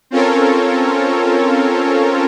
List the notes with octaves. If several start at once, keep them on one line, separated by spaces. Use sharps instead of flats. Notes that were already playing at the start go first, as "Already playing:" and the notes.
C4 C#4 F4 A4 A#4 C#5